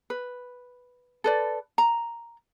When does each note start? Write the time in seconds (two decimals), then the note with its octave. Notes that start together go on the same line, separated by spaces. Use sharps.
0.10 B4
1.24 A4 B4 D5
1.78 A#5